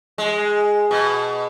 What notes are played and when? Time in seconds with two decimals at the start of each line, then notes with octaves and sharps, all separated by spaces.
0.18 G#3
0.91 B2